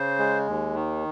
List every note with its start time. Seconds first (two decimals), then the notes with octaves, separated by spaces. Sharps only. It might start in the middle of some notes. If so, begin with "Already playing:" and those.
Already playing: C#3 C5
0.19 G#3
0.47 D#2
0.75 D#3